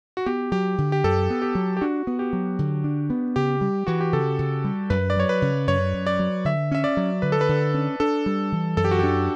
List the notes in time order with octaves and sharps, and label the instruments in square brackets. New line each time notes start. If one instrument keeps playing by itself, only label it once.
[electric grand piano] F#4
[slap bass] B3 [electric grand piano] G4
[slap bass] F#3 [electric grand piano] G4
[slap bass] D3
[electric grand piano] G4
[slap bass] F#2 [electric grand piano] A4
[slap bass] B3
[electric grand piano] G4
[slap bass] F#3
[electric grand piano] G4
[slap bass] D4 [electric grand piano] F#4
[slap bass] B3
[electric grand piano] G4
[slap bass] F#3
D3
D4
B3
[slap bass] C#3 [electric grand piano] G4
[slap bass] G3
[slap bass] E3 [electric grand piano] F#4
[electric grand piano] G4
[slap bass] C#3 [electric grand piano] A4
[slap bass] C#3
G3
[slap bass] F#2 [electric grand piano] B4
[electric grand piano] D5
[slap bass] F#3 [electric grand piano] C#5
[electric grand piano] B4
[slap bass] C#3
[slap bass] F#2 [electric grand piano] C#5
[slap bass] F#2
[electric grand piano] D5
[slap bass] F#3
[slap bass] D3 [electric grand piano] E5
[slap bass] C#4 [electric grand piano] E5
[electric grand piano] D5
[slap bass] F#3
[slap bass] D3 [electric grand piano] B4
[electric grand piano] A4
B4
[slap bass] D3
C#4
[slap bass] D4 [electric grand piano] A4
[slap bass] G3
E3
[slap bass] F#2 [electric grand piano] A4
[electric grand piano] G4
F#4
[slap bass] D4 [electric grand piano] G4